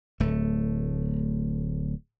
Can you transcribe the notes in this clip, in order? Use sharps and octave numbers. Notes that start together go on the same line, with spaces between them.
D1 A3